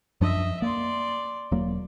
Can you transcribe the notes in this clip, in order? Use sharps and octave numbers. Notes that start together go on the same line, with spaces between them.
F#2 F3 D4 D#5 E5
A#3 D5 C6
E1 F#3 A#3